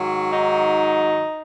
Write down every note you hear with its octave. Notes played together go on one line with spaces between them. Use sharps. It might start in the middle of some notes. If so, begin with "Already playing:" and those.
Already playing: G#2 D#3 F#3
D#4